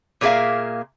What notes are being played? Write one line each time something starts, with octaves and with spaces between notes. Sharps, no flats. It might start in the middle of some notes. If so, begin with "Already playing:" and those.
A#2 A#3 G#4 E5 F5